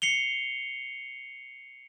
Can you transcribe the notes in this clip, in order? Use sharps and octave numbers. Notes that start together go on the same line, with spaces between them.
C7 C#7 F7 G7